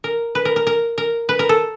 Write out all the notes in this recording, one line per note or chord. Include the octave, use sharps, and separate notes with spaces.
A#4
B4
A#4
A#4
A#4
A#4
B4
A#4
A4